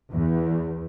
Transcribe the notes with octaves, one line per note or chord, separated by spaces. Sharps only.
E2